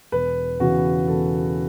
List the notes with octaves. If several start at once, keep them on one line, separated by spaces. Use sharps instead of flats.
E1 B4
E2 C#3 E3 F#4
E1 A4